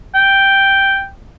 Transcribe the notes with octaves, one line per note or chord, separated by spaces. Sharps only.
G5